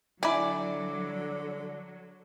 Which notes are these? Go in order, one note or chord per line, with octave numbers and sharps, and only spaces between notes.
D3 F#3 E4 D5 G#5